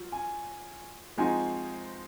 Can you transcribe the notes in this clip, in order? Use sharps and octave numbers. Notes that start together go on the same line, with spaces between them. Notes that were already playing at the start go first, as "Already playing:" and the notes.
Already playing: F#3 F4
G#5
F3 G#3 C4 D#4 F#4 G#5